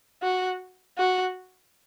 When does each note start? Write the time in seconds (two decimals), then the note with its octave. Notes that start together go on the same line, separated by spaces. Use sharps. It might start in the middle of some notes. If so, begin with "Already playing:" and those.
0.22 F#4
0.98 F#4